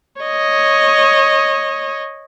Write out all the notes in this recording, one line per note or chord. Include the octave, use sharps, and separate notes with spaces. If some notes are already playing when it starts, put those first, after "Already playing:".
C#5 D#5